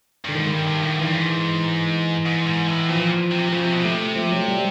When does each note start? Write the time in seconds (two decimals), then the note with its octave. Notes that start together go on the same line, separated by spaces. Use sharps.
0.25 G2 D3
0.35 G#2 D#3
0.51 G2
0.67 G2
0.82 A2
0.93 G#2
0.99 G2 E3
1.13 G#2
2.26 G#2
2.46 G#2
2.68 A2
2.89 A#2 F3
3.32 C3
3.52 C#3 F3
3.63 C3
3.73 B2
3.84 C3 A3
4.16 F3
4.32 F#3
4.48 G3